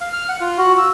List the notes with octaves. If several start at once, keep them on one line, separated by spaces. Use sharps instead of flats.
F5
F6
F#5
F4
F#4
E6